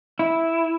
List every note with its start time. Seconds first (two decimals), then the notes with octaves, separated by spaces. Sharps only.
0.19 E4